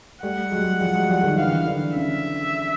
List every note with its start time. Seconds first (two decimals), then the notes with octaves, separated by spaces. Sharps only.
0.23 G3 A3 F#5
0.51 F#3 G#3
0.80 F3 G3
0.94 F#3 G#3
1.09 F3 G3
1.23 D#3 F3
1.37 D3 E3 F5
1.66 D3 E3
1.96 C#3 E5